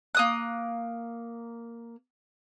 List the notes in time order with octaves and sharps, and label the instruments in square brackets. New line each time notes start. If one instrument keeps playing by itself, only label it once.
[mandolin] A#3 D#6 F#6